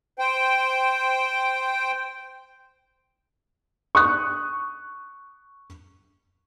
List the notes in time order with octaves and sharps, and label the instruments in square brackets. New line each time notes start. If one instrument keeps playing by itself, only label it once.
[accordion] C5 G5
[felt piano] C#6 D#6 F#6